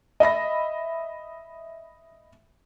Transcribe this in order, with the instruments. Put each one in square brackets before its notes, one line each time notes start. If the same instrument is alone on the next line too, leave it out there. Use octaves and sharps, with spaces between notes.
[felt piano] D#5 E5 B5 A#6